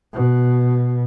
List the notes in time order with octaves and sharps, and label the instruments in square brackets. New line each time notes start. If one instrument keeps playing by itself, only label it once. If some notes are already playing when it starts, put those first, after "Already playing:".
[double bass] B2